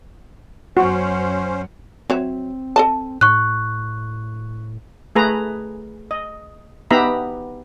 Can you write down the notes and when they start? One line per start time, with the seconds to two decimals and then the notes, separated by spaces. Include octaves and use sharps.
0.77 F#2 F#3 C#4 F#4 C5
2.10 F#3 C4 C#5 E5
2.76 A4 D#5 A5
3.21 A2 C#6 F#6
5.15 A3 G#4 B4 A#5
6.11 D#5
6.91 B3 D#4 G4 E5 A#5 B5